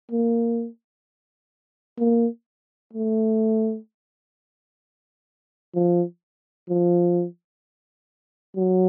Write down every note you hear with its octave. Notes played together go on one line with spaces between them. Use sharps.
A#3
A#3
A3
F3
F3
F#3